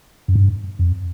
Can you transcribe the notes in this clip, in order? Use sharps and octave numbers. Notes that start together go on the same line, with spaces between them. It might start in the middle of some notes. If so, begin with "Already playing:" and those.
F#2
G2
F2